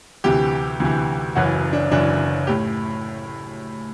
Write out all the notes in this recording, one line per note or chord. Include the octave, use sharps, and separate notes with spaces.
D2 C3 E3 G4
D2 C3 E3
F#1 F#2 E3 F#4
D4
F#1 F#2 E3 D4
A2 G4